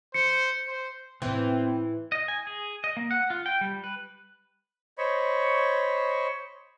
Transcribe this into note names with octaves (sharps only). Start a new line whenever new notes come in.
C5 C#7
C5
A2 E3 B3 C4
D#5
G#5
G#4
D#5
A#3
F#5
F4
G5
G3
B4
C5 C#5 D#5 B5 C#6